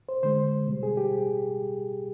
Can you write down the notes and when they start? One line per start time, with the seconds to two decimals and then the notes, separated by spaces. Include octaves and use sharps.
0.09 C5
0.23 D3 G#3 C5
0.67 B2 G3
0.83 G#4
0.97 G4